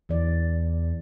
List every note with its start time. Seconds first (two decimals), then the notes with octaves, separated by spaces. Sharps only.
0.09 E2 E3 D5